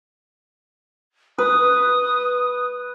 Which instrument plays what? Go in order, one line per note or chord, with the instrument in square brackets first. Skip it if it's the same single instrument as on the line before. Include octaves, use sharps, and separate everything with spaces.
[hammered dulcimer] B4 [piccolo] D#6